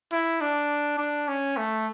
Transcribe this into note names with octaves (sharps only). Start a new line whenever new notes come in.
E4
D4
D4
C#4
A3